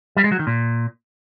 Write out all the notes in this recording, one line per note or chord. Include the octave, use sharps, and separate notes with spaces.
G3
G#3
F#3
D#3
A#2